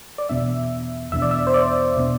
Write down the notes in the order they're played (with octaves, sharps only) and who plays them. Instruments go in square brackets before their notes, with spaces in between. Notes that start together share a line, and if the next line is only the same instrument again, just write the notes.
[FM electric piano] D5
[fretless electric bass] E2 B2 B3 D4 [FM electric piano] E5
[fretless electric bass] E2 B2 B3 D4 [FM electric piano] E5
[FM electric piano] D5
E5
C5
D5
[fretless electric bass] B2 B3 D4